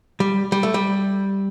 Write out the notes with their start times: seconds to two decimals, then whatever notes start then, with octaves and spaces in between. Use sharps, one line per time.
0.20 G3
0.52 G3
0.63 A3
0.74 G3